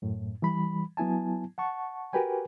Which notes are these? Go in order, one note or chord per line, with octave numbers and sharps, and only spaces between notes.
F#2 A2
E3 G3 B5
F#3 B3 E4 G#5 A5
F#5 A5 C#6
F#4 G4 A#4 B4 G5 G#5